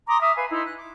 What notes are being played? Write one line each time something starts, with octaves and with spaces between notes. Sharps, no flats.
A#5 C6 D6 D#6
E5 D6 D#6 F6
B4 F5 G#5
D#4 E4 A#5 C6
F#6
D6